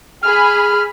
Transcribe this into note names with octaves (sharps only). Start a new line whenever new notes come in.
G#4 B5 F6